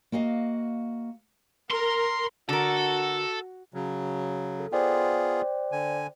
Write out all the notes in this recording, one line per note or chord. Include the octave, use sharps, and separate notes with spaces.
A#3 F#4 D#5 F5
A#4 C6
D3 F#4 A4 A#4
C#3 F#3
A4
B3 F4 G#4 C5 D5 G5
D3 G#5